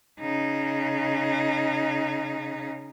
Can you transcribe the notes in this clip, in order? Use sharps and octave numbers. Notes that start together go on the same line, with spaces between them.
C#3 D#4